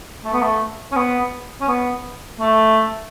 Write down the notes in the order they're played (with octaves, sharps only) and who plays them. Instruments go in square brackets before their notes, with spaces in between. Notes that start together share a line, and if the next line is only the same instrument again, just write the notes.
[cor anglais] A3
B3
A3
C#4
B3
C#4
B3
A3